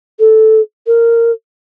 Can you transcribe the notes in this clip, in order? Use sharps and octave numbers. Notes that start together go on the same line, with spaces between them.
A4
A#4